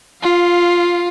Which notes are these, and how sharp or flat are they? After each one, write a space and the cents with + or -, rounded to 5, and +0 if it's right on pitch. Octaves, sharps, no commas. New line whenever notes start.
F4 +0 F5 +20